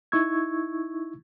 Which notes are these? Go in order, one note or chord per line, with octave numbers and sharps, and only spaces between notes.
D#4 E4 C#6 E6 G#6